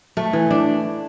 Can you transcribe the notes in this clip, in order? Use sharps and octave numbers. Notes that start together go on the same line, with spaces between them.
A3
E3
D4